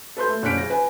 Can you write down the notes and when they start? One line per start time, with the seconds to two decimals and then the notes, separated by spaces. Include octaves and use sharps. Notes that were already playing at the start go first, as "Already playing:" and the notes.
0.17 A4 B4 C6 G6
0.29 A3
0.43 F#1 C#4 D4 F#6 B6 D7
0.57 C#3 A#6
0.70 B4 G#5